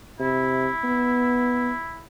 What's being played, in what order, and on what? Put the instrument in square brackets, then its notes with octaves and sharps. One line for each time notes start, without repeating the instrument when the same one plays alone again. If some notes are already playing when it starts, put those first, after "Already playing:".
[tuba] C3 [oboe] E4
[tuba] B3